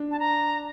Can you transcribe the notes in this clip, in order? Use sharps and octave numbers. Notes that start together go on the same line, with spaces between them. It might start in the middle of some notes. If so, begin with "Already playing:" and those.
Already playing: D4
A5
A#5